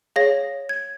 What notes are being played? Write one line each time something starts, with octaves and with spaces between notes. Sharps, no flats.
G#4 C#5 F5 A#6
G#6